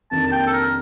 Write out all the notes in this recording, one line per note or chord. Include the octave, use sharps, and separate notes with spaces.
F2 C3 D#3 A#3 D4 A5
A5
G5
A4
A#4